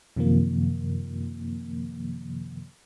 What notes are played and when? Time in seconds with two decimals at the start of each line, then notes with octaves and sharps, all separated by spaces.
0.16 F#2 C3 D#3 F3 A#3